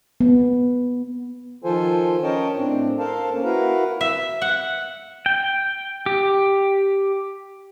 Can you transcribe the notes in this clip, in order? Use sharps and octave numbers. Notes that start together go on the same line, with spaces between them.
B3
D#3 F3 F4 A4 C5 G#5
C#4 A#4 C#5 D#5 G5 A5
A2 C4 D4
A4 A#4 C5 F5 A5
A#3 C#4
E4 F#4 A#4 B4 F5 A#5
E5
F#5
G5
G4